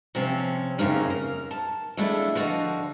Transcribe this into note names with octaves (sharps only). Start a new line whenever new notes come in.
C3 F3 C4 C#4
F#2 C#3 A#3 C4 C#4 D#4
A#4
A5
F2 G#3 A3 D4 E4
D3 F3 F#4 D#5